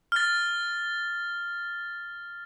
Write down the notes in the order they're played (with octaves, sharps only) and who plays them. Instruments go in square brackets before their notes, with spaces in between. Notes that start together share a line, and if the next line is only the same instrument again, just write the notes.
[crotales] F6 A6